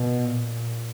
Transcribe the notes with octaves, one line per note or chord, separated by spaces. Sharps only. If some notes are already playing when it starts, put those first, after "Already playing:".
Already playing: B2
A#2